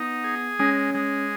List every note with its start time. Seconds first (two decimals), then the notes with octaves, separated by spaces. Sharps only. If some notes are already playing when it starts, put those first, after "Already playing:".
Already playing: B3 D#4
0.24 G#4
0.59 G#3 C#4
0.95 G#3